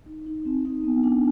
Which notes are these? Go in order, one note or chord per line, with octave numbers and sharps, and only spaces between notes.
D#4
D#4
C4
D#4
B3
D4